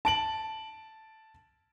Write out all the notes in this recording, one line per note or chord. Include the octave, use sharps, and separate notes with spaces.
A5 D7 F#7